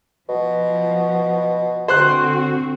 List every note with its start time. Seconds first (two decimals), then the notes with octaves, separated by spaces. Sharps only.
0.29 B2 F3
1.88 D3 C4 F#4 C5 C6 F#6